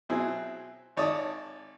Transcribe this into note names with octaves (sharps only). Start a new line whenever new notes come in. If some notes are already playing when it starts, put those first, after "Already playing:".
B2 F#3 C4 E4 G#4
G#1 C#5 D5 A5 D#6